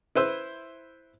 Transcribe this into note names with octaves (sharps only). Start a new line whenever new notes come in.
E4 B4 C5 E6